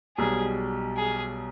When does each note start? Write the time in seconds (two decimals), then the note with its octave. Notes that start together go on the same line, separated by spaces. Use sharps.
0.17 B1 B2 G3 G#4
0.97 G#4